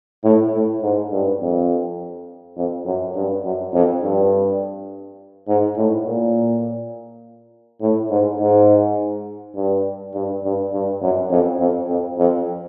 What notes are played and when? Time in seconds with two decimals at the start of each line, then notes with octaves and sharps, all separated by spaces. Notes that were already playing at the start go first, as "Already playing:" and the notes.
0.24 A2
0.53 A2
0.82 G#2
1.12 G2
1.41 F2
2.57 F2
2.86 F#2
3.15 G2
3.44 F#2
3.74 F2
4.03 G2
5.48 G#2
5.77 A2
6.06 A#2
7.81 A2
8.10 G#2
8.39 G#2
9.55 G2
10.14 G2
10.43 G2
10.72 G2
11.01 F#2
11.30 F2
11.60 F2
11.89 F2
12.18 F2